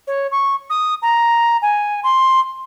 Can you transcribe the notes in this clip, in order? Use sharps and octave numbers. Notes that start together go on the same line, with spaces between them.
C#5
C#6
D#6
A#5
G#5
C6